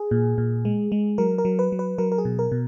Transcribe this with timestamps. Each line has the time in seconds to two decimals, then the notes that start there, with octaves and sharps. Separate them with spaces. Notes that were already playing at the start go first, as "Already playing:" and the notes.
Already playing: G#4
0.11 A#2
0.38 A#2
0.65 G#3
0.92 G#3
1.18 F#3 A#4
1.38 A#4
1.45 F#3
1.59 B4
1.72 F#3
1.79 B4
1.98 F#3 A#4
2.12 A#4
2.18 G#4
2.25 B2
2.39 A#4
2.52 B2